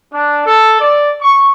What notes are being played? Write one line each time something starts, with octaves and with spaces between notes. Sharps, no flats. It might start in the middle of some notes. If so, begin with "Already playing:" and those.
D4
A4
D5
C#6